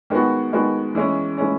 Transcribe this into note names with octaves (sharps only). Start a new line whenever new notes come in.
D#3 G#3 B3 F#4
D#3 G#3 B3 F#4
E3 G#3 C#4
E3 G#3 C#4